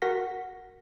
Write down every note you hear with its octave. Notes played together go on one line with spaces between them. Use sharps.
F#4 A#4 F#5 A#6 B6